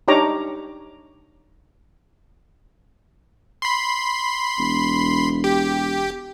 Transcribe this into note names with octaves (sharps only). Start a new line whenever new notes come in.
D4 D#4 G4 C#5 A#5 D6
B5 C6
E1
G4